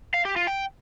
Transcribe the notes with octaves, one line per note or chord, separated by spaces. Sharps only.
F5
G4
F4
G5